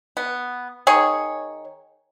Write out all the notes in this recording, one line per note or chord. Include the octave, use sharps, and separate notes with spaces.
B3
D#3 G#4 C#5